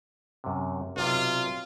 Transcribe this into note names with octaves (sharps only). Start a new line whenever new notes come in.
F#2 C3
B1 C3 F4